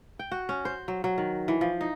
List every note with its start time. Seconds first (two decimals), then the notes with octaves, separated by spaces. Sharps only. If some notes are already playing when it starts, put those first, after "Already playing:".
0.19 G5
0.32 F#4
0.49 C#4
0.65 C5
0.88 F#3
1.04 F#3
1.18 D#3
1.48 E3
1.61 F3
1.81 D#4